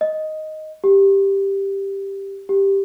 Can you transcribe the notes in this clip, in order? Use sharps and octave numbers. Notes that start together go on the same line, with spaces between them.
D#5
G4
G4